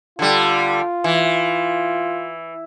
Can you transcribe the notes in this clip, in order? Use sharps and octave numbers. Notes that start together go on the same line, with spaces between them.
D3 G3 F4
E3